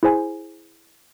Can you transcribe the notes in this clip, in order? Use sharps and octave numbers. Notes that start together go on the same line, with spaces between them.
E4 G#4 C5 G#5